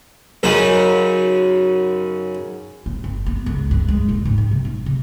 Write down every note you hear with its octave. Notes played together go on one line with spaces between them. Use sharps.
F#2 C#3 F#3 D#4
C4
G1
B3
C#2
G2
G#3
D#1
G#2
D#4
C3
C4
C3